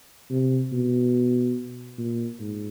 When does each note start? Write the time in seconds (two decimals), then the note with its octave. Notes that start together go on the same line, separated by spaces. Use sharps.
0.30 C3
0.72 B2
1.98 A#2
2.40 G#2